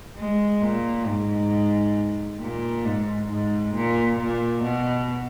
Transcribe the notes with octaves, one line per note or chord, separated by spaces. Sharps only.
G#3
A#2
G#2
A#2
G#2
G#2
A#2
A#2
B2